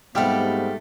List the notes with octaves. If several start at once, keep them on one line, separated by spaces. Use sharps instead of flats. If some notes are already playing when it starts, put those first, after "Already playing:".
G#2 F3 G3 A3 B3 C4 G4